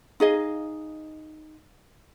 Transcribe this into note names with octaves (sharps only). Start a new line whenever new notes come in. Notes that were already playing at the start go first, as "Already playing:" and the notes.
D#4 G#4 D#5 F5